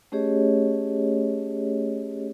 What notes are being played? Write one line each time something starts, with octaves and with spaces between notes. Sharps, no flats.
A3 C#4 G4 G#4 C#5 D#5